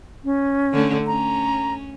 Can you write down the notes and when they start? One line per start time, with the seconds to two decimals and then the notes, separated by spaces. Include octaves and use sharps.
0.24 C#4
0.73 D3 A3
1.07 C#4 A#5